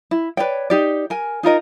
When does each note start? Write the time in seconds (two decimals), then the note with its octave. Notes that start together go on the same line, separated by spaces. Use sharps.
0.11 E4
0.37 B4 C#5 D5 G5
0.70 D#4 G4 D5
1.10 A#4 G#5
1.43 D#4 F4 A#4 D#5